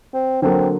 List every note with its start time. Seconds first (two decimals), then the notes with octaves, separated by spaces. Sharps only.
0.14 C4
0.42 D3 F#3 A#3 C4